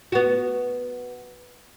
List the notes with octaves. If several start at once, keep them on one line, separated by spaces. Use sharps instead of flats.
B3 F#4